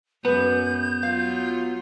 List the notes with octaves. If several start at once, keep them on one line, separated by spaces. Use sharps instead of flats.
F#2 B3 G#4 B4 G6
F#3 F4 F5